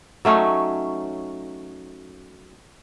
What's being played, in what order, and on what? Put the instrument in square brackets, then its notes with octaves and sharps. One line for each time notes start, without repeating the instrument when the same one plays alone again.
[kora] F#3 A3 C#4 D#4